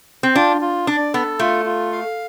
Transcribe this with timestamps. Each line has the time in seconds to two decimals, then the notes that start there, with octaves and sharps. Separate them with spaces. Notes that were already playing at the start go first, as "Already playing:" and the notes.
0.23 C4
0.35 D4 F4
0.61 F4
0.87 D4 D5
1.14 B3 A4
1.39 A3 F4
1.66 F4
1.92 F5